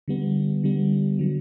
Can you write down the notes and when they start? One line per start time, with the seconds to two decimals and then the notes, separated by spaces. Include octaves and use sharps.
0.08 D3 G3 B3
0.64 D3 G3 B3
1.19 D3 F#3